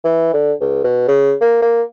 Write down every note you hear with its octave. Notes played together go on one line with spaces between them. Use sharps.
E3
D3
C#2
B2
C#3
A#3
A#3